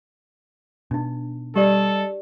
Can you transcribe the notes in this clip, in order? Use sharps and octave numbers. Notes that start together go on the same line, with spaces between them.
B2 D4 D#4
G3 G4 A4 D5 D#5